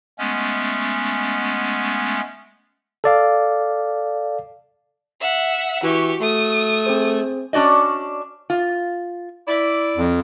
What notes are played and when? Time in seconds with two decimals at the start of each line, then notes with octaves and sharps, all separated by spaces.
0.18 G#3 A3 B3 C#4
3.04 A4 D5 F5
5.20 E5 F#5
5.83 E3 F#4 G4 C#6
6.21 A3 D#6
6.86 C4 G#4 C5
7.53 C#4 D4 F#4 D5 D#5
8.50 F4
9.48 E4 D5
9.97 F2